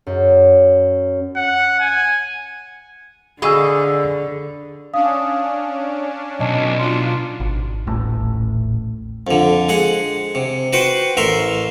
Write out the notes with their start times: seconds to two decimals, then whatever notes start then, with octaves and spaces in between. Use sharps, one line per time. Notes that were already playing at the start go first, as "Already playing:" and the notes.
0.07 F#2
1.36 F#5
1.80 G#5
3.42 D3 G#4 D#5 F5 B5 C#6 E6
4.94 C#4 D4 F5 D#6
6.40 B1 D#5 A5
6.79 D4 F4 C6
7.40 G#1
7.87 D#1 A1 A2
9.27 F2 D3
9.69 G#3 G#4 F#5
10.35 C3
10.73 F#4 B4 C5 F#5 G5
11.17 A1 A#4 E5 C6